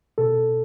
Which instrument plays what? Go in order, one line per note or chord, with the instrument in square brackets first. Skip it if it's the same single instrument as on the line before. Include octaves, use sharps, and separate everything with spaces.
[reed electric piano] B2 A4